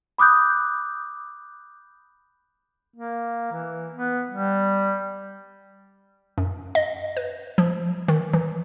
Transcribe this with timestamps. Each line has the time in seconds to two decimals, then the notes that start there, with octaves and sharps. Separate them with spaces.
0.18 B5 D6 D#6 F#6 G6
2.96 A#3
3.52 E3
3.95 B3
4.30 G3
6.38 F#2
6.75 D#5
7.17 B4
7.58 F3
8.08 D#3
8.34 E3